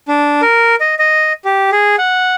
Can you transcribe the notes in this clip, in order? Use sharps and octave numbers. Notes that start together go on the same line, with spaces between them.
D4
A#4
D#5
D#5
G4
G#4
F#5